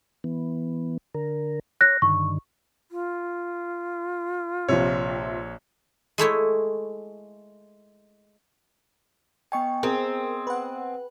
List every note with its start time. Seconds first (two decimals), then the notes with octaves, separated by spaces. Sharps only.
0.24 E3 B3
1.15 D3 A#4
1.81 C#5 F#6 A#6
2.02 G2 D3 D#3 C#6
2.91 F4
4.69 A#1 C3 F3 C#5
6.18 G#3 A3 E4 C#5
9.52 B3 D#5 G5 G#5 C#6
9.83 C4 G#4 A#4
10.47 B4 F#5